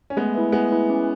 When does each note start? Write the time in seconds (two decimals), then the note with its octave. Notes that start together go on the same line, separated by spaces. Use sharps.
0.10 C#4
0.17 G#3 A3 B3
0.34 E4 B4 E5
0.52 G#3 A3 B3
0.71 E4 B4 E5
0.90 C#4